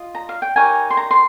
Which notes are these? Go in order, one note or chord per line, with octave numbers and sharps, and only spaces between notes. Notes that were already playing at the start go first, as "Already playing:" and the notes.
Already playing: F4 D#5
A#5
F5
G5
D#4 G4 A#4 C#5 G#5
C6
A#5
C6